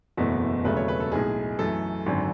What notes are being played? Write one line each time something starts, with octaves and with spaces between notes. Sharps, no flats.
F#1 E2 B2 A3 F#4
E1 D2 C#3 F#3 A3 B4
C#5
B4
A4
B1 A2 G#3 G#4
F#2 E3 A3 A4
G#1 F#2 D3